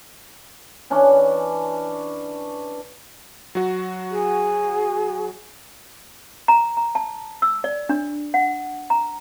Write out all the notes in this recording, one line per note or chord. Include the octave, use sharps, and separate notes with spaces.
E3 C#4 D4
F#3 F#4
G#4
A#5
A#5
A5
E6
D5
D4
F#5
A#5